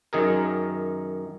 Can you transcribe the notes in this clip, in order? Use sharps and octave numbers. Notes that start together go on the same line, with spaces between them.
F#2 D#3 G#4 A#4